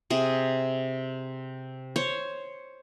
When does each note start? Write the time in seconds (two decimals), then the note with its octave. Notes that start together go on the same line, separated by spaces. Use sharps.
0.10 C3 G#4
1.96 C5 C#5